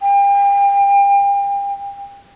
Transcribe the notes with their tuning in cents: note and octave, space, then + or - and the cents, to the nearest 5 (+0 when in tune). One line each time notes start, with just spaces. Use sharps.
G5 +35